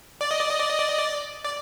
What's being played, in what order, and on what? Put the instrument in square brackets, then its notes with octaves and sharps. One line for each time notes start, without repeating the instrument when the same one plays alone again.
[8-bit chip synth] D5
D#5
D5
D#5
D5
D#5
D5
D#5
D5
D5